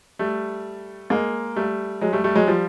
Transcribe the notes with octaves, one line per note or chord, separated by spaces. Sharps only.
G3 A3
G#3 A#3
G3 A3
F#3 G#3
G3 A3
G3 A3
F#3 G#3
F3 G3